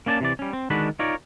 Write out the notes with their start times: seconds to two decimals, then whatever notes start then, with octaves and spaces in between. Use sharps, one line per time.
0.06 A#3 C#4 D5 G#5 A5
0.21 C3 E3 D5
0.39 G3 C#4
0.53 C4
0.70 D3 D#3 G#3 D4 F#4 B5
0.99 D#4 F4 A#4 C#5 D5